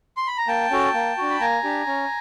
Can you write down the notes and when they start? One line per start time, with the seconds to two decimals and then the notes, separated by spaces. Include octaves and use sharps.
0.17 C6
0.27 B5
0.38 A#5
0.48 A#3 G5 A5
0.70 C#4 F#4 A4
0.94 A#3
1.18 D4 F#4
1.30 B5
1.40 A#3 G#5 A#5
1.64 D4 G4
1.87 C#4